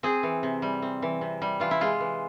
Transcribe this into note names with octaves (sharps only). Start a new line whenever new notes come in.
C4 G#4
E3
C3
G3
C4
E3
C3
G3
E3 F4
E4
G#3 F4
E3